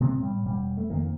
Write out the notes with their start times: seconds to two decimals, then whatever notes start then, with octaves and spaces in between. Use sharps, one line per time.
0.01 C3 G#3 B3 C4
0.20 A2 G3
0.44 E1 G3
0.77 A3
0.90 F2 D#3 A#3